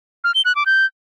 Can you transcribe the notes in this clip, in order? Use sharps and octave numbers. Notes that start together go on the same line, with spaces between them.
F6
G7
F#6
D6
G6